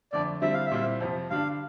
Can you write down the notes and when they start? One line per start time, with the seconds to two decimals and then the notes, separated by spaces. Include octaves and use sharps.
0.13 F2 D3 A3 D5
0.42 D3 G3 C4 E4 E5
0.54 F5
0.66 E5
0.71 A#2 G3 C4 E4
1.00 F2 C3 F3
1.30 G2 D3 G3 D4 F5